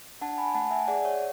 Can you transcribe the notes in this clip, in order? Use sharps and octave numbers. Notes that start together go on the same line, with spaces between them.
D4 F#5 A5
G#5 B5
A3 F#5 A5
E5 G#5
G#4 D5 F#5
C#5 E5